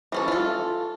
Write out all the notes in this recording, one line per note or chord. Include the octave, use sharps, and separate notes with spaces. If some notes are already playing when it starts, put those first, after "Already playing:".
E3 C#4 A4
F4 A4